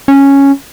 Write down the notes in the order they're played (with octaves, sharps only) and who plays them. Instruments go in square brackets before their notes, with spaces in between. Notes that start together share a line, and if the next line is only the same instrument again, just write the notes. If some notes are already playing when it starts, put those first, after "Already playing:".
[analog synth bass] C#4